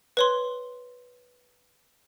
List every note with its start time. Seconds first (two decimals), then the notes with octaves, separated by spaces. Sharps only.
0.17 B4 C#5 C6